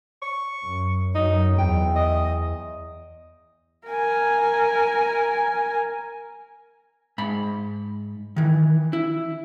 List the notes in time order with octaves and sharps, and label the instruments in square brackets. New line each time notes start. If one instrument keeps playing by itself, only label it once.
[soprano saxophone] C#6
[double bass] F#2
[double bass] F#2 F#3 [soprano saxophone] D#4
[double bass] E2 [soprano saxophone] G5
[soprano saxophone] D#5
[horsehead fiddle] A#4 G#5
[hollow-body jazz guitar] G#2 B5
D#3 E3
E4